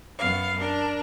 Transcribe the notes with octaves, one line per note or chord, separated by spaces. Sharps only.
F#2 B3 F5
D4 A#4